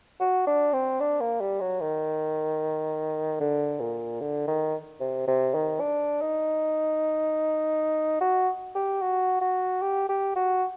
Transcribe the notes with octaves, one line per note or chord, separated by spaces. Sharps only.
F#4
D4
C4
D4
A#3
G3
F#3
D#3
D3
A#2
D3
D#3
C3
C3
D#3
D4
D#4
F#4
G4
F#4
F#4
G4
G4
F#4